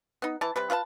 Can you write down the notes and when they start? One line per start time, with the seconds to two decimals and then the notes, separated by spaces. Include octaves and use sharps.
0.22 B3 D#4
0.41 E3 A5
0.56 C3 G3 B4
0.70 F4 B4 E5 A5